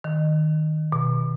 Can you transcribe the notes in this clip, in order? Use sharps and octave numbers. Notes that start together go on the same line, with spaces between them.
D#3
B2